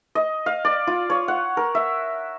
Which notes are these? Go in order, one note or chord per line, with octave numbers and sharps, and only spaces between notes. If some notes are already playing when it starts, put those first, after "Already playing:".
D#5
F5
D5
F4
C#5
F#5
A#4
E5